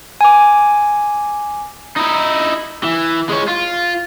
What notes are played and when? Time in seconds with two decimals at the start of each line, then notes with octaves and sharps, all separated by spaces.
0.21 G#5 D6
1.97 D#4 E4
2.83 E3
3.29 G#3 C#5
3.48 F4